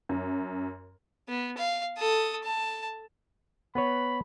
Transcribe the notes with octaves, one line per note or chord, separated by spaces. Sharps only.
F#2
B3
F5
A4 D#6
A5
B3 B4 C#5 B5